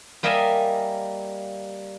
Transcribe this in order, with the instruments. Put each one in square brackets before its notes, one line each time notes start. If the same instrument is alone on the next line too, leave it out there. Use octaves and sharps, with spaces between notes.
[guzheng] G3 A#3 A#4 D#5 E5 G#5